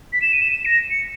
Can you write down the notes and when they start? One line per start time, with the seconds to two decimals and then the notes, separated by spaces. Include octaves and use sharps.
0.13 B6
0.22 E7
0.33 D#7
0.42 E7
0.52 E7
0.65 A#6
0.90 C#7